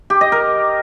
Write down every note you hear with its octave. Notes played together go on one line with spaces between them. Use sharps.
G4
D#5
A#4